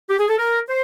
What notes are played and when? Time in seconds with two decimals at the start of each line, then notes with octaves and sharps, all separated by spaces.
0.09 G4
0.19 G#4
0.29 A4
0.39 A#4
0.69 C5